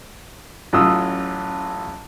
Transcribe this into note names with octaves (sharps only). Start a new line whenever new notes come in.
A1 F#3 C#4 F4 D#6 E6